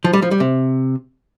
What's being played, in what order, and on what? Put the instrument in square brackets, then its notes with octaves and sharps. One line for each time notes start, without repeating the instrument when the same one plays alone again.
[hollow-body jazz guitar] F3
G3
F3
G3
C3